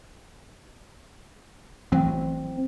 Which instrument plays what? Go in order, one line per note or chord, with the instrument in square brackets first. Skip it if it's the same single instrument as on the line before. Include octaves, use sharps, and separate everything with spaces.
[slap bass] A1 E3 F#3 [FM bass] C4